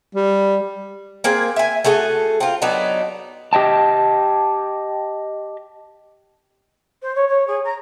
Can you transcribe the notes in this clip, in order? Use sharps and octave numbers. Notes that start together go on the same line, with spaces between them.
G3
A#3 C4 G#4
E5 G#5
A3 F#4 G#4 A4
C4 F4
F#3 B3 D4 D#4
G4 D#5 G5 A5
C5
C#5
C#5
G#4
A#5